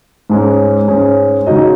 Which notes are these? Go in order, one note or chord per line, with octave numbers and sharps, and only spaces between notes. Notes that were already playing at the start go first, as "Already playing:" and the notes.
G#2 G#3 C#4
G#2 G#3 C#4
C#3 G#3 D#4 F#4 D#5